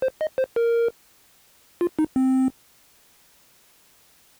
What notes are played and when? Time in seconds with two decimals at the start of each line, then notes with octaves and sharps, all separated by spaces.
0.02 C5
0.21 D#5
0.38 C5
0.56 A#4
1.81 F4
1.99 D#4
2.16 C4